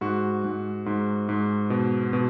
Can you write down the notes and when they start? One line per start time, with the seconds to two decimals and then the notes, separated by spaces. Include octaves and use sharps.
0.01 G#2 F#4
0.44 G#2
0.86 G#2
1.29 G#2
1.70 B2
2.13 B2